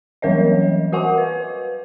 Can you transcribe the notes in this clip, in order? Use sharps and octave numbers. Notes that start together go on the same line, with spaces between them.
E3 F#3 G3 A#4 C#5 D#5
F#4 A#4 D#5 F#5 G#5 C#6
B4